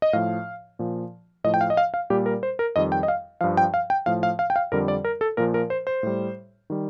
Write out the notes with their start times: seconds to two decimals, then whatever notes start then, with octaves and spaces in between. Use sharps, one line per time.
0.02 D#5
0.13 A2 F3 F5
0.79 A#2 F3
1.44 A2 F3 D#5
1.54 G5
1.61 F5
1.70 D#5
1.77 F5
1.94 F5
2.10 A#2 G3 G4
2.26 A#4
2.43 C5
2.59 A#4
2.76 F2 D#3 G3 D#5
2.92 G5
3.03 D#5
3.08 F5
3.41 G2 F3 F5
3.57 G5
3.74 F5
3.90 G5
4.06 A2 F3 F5
4.23 F5
4.39 F5
4.50 G5
4.56 F5
4.72 F2 D3 G3 A#4
4.88 D5
5.05 A#4
5.21 A4
5.37 A#2 F3 A#4
5.54 A#4
5.70 C5
5.87 C5
6.03 A2 G3
6.70 D#3 G3